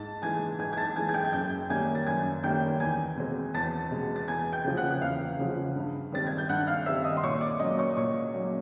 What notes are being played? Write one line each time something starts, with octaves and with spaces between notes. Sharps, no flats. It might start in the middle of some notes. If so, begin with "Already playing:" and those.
Already playing: G#2 A5 A6
E3 G#3 G#5 G#6
G#2 G#5 G#6
G#6
A5 A6
E3 G#3 G#5 G#6
G#6
G5 G6
G#6
F#2 G5 G6
D#3 G3 A#3 C#4 G#5 G#6
A6
F#2 G#5 G#6
D#3 G3 A#3 C#4 G5 G6
E2 G#5 G#6
B2 G#3 C4
E2 A5 A6
B2 G#3 C4
A6
E2 G#5 G#6
G5 G6
C#3 F3
F#5 F#6
F#6
E2 F5 F6
C#3 F3
G2
D#3 G3 C4 A6
G#6
G6
G2 F#5 F#6
F5 F6
D#3 G3 C4 E5 E6
D#5 D#6
C6
A#2 C#5 C#6
D5 D6
F#3 A#3 C#4 D#5 D#6
C#5 C#6
A#2 C#5 C#6
F#3 A#3 C#4